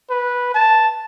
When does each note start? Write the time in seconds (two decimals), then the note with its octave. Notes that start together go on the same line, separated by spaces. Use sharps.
0.10 B4
0.54 A5